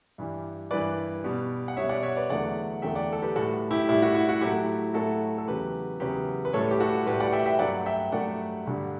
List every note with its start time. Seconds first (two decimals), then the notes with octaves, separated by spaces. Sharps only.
0.18 G2 E3 G3
0.71 G2 E3 G3 B4 D5
1.24 B2 G3
1.68 F#5
1.77 B2 G3 C#5 E5
1.89 D5 F#5
2.03 C#5 E5
2.17 B4 D5
2.29 E2 D3 F#3 A3 D5 F#5
2.82 E2 D3 F#3 A3 E5 G5
2.95 D5 F#5
3.13 A4
3.22 G4 B4
3.36 A2 F#4 A4
3.39 G3
3.71 E4 G4
3.88 A2 G3 E4
4.02 F#4
4.15 E4
4.29 F#4
4.41 A2 F#3 A3 E4 G4
4.94 A2 F#3 A3 F#4 A4
5.38 A4
5.47 E2 C#3 F#3 G4 B4
6.00 E2 C#3 F#3 G4 B4
6.45 B4
6.53 A2 G3 A4 C#5
6.71 G4
6.80 F#4 A4
7.06 A2 G3 G4 B4
7.20 D5 F#5
7.33 E5 G5
7.46 E5 G5
7.59 G2 F#3 A3 D5 F#5
7.86 E5 G5
8.12 G2 F#3 A3 D5 F#5
8.66 G2 D3 G3